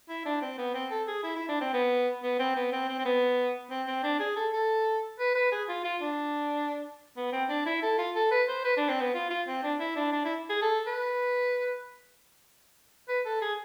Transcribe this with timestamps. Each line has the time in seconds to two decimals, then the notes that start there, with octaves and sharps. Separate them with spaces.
0.09 E4
0.25 D4
0.42 C4
0.58 B3
0.74 C4
0.91 A4
1.08 G#4
1.24 E4
1.36 E4
1.48 D4
1.61 C4
1.73 B3
2.23 B3
2.39 C4
2.56 B3
2.72 C4
2.89 C4
2.99 C4
3.05 B3
3.70 C4
3.87 C4
4.03 D4
4.20 G#4
4.36 A4
4.53 A4
5.19 B4
5.35 B4
5.52 G#4
5.69 F4
5.85 F4
6.01 D4
7.17 B3
7.32 C4
7.49 D4
7.66 E4
7.82 A4
7.99 F4
8.15 A4
8.31 B4
8.48 C5
8.65 B4
8.77 D4
8.89 C4
9.01 B3
9.14 F4
9.30 F4
9.47 C4
9.63 D4
9.80 E4
9.96 D4
10.12 D4
10.25 E4
10.50 G#4
10.62 A4
10.87 B4
13.09 B4
13.25 A4
13.42 G#4